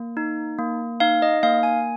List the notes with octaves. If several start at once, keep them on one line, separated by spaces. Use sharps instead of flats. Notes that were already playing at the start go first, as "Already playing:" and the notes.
Already playing: A#3
D#4
A#3
D#4 F5
D#5
A#3 F5
G#5